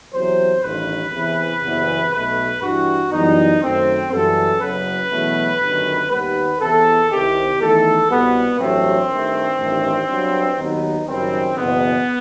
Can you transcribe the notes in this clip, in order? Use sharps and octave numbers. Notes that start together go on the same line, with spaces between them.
E2 C3 F#3 C5
A1 G2 D#3 B4
E2 C3 E3
F#1 E2 C3 E3 B3
B1 B2 A3 B4
G2 E3 G3 F#4
F#2 E3 G3 B3 D#4
F#2 D#3 A3 C4
F#2 E3 G3 B3 A4
F#1 F#2 F#3 B3 B4
E2 B2 F#3 A3
G1 F#2 D#3
D#2 D#3 G3 B3 B4
E2 C3 E3 B3 A4
C2 C3 D#3 G4
E2 D#3 A3 A4
C2 B2 G3 B3
A1 G2 F#3 A3 C4
G2 D#3 A3
A1 G2 D#3 A3
G2 F#3 B3
D#2 D#3 F#3 B3 D#4
F#1 F#2 D#3 G3 C4
F#1 E2 B2 B3